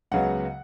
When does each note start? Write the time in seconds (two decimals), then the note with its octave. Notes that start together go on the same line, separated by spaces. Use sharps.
0.11 C#2 C#3 F#3 B3 F#5